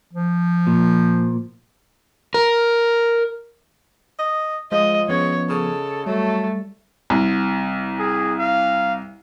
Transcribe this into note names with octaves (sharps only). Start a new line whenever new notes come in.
F3
A#2
A#4
D#5
F3 G#3 D#5
F3 G#3 B3 C#4 C#5
C#3 A4
F#3 G3 A3
C2
G#4
F5